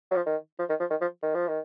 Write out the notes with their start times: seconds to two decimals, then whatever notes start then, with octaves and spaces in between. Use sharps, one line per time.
0.11 F#3
0.16 F3
0.26 D#3
0.59 F3
0.69 D#3
0.80 F3
0.90 D#3
1.01 F3
1.22 D#3
1.35 F3
1.48 D#3